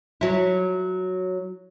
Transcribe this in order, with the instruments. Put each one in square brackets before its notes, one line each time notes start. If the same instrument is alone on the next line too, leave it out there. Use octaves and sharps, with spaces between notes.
[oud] F#3 E4